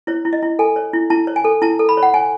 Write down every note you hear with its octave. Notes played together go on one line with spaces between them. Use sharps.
E4 C#5
E4
D#5
E4
A4 G#5
C#5
E4
E4 A5
C#5
G#5
A4
E4 A5
A4
B5
C#5
F#5
C#5 G#5